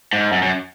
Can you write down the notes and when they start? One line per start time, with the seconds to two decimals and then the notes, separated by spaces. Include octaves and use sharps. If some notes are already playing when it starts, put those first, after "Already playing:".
0.13 G#2
0.32 F#2
0.43 F#2